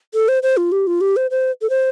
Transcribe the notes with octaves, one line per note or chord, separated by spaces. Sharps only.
A4
C5
C5
F4
G4
F4
G4
C5
C5
A4
C5